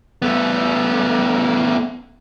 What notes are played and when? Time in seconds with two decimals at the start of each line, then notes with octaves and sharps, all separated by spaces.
0.22 A3 B3